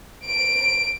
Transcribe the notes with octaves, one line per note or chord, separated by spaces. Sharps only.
D7